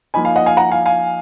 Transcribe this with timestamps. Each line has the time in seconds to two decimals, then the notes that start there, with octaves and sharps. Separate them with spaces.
0.14 F3 A#3 D#4 G#5 B5
0.25 F5 G#5
0.36 D#5 F#5
0.46 F5 G#5
0.57 F#5 A#5
0.71 F5 G#5
0.86 F5 G#5